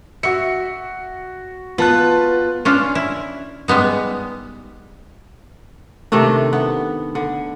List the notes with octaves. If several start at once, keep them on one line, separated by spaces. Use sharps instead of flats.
F#4 E5 C#7
B3 F4 A5 F#6
C#4 D4 F4
E4
G3 G#3 B3 D#4
C3 D#3 A3 D4
B3
D3